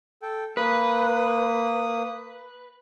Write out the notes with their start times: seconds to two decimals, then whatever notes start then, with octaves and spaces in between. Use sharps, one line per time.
0.22 A4 G5
0.57 A#3 B4 D#6